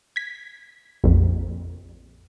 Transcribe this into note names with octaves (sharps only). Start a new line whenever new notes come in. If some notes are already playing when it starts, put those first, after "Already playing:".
G#6 B6
A#1 F2